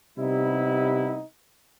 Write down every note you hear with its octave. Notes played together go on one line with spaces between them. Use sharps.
C3 G3 B3 D#4 E4